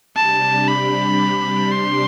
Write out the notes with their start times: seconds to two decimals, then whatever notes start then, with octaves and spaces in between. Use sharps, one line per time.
0.16 C3 G3 D4 G4 A5
0.68 B5
1.72 C6